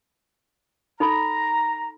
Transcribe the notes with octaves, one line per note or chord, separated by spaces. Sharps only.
D#4 A4 A#5 B5